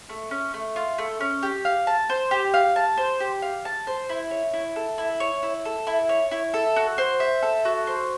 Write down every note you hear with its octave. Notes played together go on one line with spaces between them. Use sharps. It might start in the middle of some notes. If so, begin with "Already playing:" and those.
A3
C#4
A3
F4
A3
C#4
G4
F5
A5
C5
G4
F5
A5
C5
G4
F5
A5
C5
E4
C#5
E4
A4
E4
C#5
E4
A4
E4
C#5
E4
A4
F#4
C5
E5
A4
F#4
C5